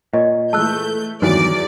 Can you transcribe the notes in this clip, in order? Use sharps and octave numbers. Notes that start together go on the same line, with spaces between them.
A#2 C#5 D#5
E3 G#3 A3 A5 E6 F#6 G6
E2 G2 D#3 E3 F#3 D5